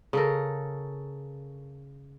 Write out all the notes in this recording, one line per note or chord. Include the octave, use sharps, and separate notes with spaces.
C#3 A4 A#4